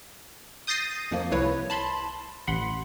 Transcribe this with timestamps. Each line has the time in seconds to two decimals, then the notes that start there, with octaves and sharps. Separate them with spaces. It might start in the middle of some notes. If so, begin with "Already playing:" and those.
0.67 D#6 G6 A6 A#6 C7 D#7
1.11 F2 F3 A#3
1.31 C2 E4 B4 C#5
1.70 A5 B5 C6
2.47 A1 F#5 B5 C6